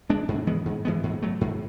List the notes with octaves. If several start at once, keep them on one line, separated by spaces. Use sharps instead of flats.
G#3 B3 D4
G#2
E3 G#3 B3
G#2
E3 G#3 B3
G#2
F#3 A3
G#2